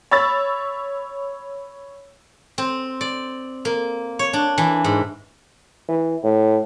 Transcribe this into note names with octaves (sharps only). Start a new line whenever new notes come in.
C#5 B5 E6 A6
C4
D5
A#3
C#5
D4
E3
G#2
E3
A2